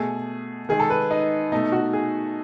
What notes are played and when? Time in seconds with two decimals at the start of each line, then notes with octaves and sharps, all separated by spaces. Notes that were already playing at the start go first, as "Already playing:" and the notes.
Already playing: B2 A3 G#4
0.69 D#3 G#3 G#4
0.80 A4
0.90 B4
1.11 D#4
1.52 B2 A3 D#4
1.72 F#4
1.93 G#4